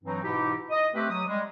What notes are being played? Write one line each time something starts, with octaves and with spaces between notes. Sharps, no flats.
G2 E3 F#3 C4 D#4
G#2 B2 E3 D#4 E4 G4
D#5
A3 C4 G4 B4
F#3 D#6
G3 G#3